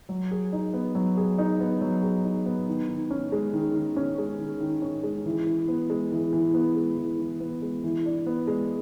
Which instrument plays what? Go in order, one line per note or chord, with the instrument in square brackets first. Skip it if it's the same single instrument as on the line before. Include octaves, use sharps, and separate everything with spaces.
[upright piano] F#3
G#4
D#4
B3
F#3
G#4
D#4
B3
F#3
G#4
D#4
B3
D#3
D#3
C#4
G#3
D#3
D#3
C#4
G#3
D#3
D#3
C#4
G#3
E3
E3
B3
G#3
E3
E3
B3
G#3
E3
E3
B3
G#3
E3
D4
B3
G#3